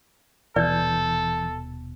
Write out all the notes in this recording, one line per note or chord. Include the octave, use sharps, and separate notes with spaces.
D#1 B2 E3 A4 B4 D5 G6